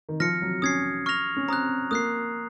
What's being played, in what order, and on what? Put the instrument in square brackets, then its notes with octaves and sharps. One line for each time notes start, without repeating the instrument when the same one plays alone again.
[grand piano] D#3
[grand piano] F3 [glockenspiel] F6 A#6 C#7
[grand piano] F#3
[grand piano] C#4 [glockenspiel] D#6 G#6 C7
[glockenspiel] C#6 F6 A#6 F7
[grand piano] C#4
[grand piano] C4 [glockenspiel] A#5 D#6 F#6
[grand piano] A#3 [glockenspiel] D#6 F#6 C7